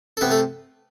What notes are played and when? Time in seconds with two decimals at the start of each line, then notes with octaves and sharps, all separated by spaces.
0.17 A4
0.21 C3 B3 B4
0.31 A3 A4